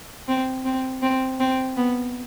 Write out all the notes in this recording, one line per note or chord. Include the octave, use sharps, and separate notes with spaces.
C4
C4
C4
C4
B3